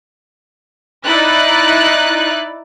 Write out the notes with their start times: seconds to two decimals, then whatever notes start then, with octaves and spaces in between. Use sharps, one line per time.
1.06 D#4 E4 D5 F#6 A6